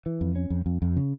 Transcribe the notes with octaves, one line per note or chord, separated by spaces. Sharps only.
E3
F2
C#4
F2
F2
F2
C#3